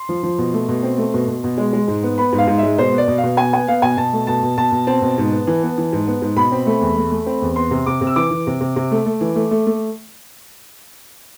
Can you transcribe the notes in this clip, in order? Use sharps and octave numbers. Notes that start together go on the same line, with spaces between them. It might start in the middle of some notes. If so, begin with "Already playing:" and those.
Already playing: C6
F3
F3
B2
A3
B2
C4
A3
B2
B2
B2
G#3
G#3
G#2
B3
B3 B5
G#2
F5
G#2
G#3 E5
B2 C5
B3
D5
B2
F5
B2
B3 G#5
B3 G#5
B3 F5
B2 G#5
B2 A5
A3
B2 A5
B2
B2 A5
B2
C4 A5
B2
G#2
B3
E3
B3
E3
G#2
B3
G#2
B2 B5
C4
A3
E2
A3
A3
C4
E2
B3 C6
C3
C3 D6
C3
E6
E3 D6
E3
C3
C3
C3
A3
A3
E3
A3
A3
A3